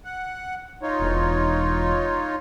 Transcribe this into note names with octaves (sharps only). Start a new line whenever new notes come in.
F#5
D#4 F4 C#5
E1